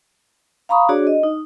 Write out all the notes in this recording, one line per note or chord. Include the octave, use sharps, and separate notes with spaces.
F5 A#5 B5 C#6 D#6
D4 F#4 G#4 C#5 D5
D#5
D#4